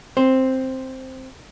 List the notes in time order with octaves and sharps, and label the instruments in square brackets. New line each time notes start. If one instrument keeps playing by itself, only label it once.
[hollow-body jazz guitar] C4 C5